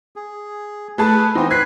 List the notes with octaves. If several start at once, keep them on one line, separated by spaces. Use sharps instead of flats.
G#4
A3 G#4 B4 A5
E3 B3 C4 D#4
B4 F#6 G#6 B6 C7